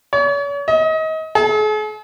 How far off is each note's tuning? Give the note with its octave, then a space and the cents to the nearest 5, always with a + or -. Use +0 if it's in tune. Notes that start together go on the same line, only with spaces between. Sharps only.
C#5 +40
D#5 +30
G#4 +45